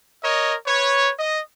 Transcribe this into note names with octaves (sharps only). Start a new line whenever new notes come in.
A#4 C#5 D#5
B4 C#5
D#5